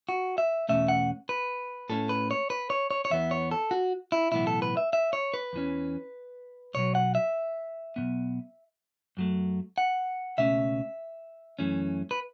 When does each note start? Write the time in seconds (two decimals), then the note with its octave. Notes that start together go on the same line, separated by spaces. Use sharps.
0.09 F#4
0.38 E5
0.69 E2 B2 A3 C#4 E5
0.88 F#5
1.29 B4
1.89 A2 A3 C#4 A4
2.09 B4
2.31 C#5
2.50 B4
2.70 C#5
2.91 C#5
3.05 C#5
3.10 E2 E3 B3 E5
3.31 C#5
3.51 A4
3.71 F#4
4.12 E4
4.32 B1 A2 E3 B3 E4
4.47 A4
4.62 B4
4.77 E5
4.93 E5
5.13 C#5
5.34 B4
5.53 E2 E3 C#4
6.74 B1 B2 F#3 C#5
6.95 F#5
7.15 E5
7.96 B1 B2 B3
9.17 F#2 F#3 A3
9.78 F#5
10.38 C#2 B2 A3 C#4 E5
11.59 F#2 E3 A3 C#4
12.11 B4